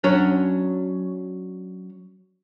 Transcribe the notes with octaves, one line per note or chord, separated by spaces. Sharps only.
F#3 C#4 D4